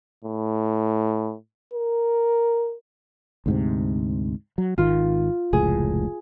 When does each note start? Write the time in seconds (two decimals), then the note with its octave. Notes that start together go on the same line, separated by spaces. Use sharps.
0.25 A2
1.74 A#4
3.46 D2 G#2 C3
4.58 F#3
4.78 G#1 D#3 F4
5.53 F1 C#2 A2 G#4